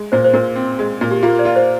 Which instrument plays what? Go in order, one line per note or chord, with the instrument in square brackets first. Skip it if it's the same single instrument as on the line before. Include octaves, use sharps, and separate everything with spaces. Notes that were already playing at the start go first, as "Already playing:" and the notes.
Already playing: [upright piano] G#3
[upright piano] A#2 [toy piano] C5
[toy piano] C5
[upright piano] A#2 [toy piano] A#4
[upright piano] C4
G#3
A#2
[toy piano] G4
[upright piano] A#3 [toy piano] F4
[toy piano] D5
[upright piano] F4
[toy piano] C5